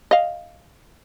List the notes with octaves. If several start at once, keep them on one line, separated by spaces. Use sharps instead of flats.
D#5 F5